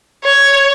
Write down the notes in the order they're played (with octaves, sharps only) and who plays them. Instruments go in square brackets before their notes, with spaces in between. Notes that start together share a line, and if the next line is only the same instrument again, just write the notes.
[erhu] C#5